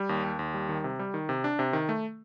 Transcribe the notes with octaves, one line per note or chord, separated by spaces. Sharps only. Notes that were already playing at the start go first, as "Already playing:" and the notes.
Already playing: G3
D#2
D#2
D#2
G3
D#3
C3
G3
D#3
C3
D4
C3
D#3
A3